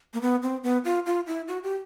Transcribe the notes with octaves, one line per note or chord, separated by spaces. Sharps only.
A#3
B3
C4
B3
F4
F4
E4
F#4
G4